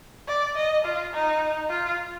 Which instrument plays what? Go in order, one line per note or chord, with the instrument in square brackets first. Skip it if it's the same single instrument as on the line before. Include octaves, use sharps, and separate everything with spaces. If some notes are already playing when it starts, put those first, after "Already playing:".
[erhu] D5
D#5
F4
D#4
F4